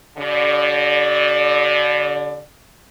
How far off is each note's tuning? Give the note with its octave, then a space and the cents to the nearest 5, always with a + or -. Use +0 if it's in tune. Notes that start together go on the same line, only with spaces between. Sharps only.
D3 -35 F#4 +40 D5 +25